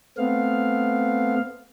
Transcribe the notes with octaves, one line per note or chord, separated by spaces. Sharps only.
A3 B3 C4 F5